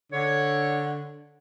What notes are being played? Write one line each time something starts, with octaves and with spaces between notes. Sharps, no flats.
D3 C#5